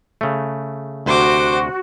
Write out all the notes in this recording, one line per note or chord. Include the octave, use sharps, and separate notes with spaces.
C#3 A3
D2 C3 F#4 C5 D6